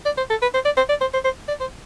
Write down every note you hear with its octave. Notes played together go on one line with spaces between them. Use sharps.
D5
C5
A4
B4
C5
D5
C5
D5
C5
C5
C5
D5
C5